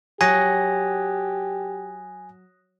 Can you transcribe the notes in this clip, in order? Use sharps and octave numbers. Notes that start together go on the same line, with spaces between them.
F#3 G4 G#5 D#6 F#6 A#6